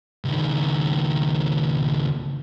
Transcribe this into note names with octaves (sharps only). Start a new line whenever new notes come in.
C#2 D#3